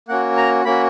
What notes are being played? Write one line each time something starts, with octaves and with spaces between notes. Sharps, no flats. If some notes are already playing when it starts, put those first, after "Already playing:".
A#3 C#4 F#4 F#5
A#5
A#3 C#4 F#4 B5